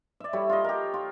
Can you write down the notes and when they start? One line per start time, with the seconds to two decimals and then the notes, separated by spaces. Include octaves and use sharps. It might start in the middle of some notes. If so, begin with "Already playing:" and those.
0.20 D5 E5
0.33 G3 E4 A4 C#5
0.49 F4 D#5
0.64 G4 A#4
0.94 F4